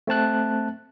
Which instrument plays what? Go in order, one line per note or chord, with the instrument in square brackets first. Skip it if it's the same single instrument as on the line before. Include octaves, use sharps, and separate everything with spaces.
[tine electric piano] A3 C4 A5 F#6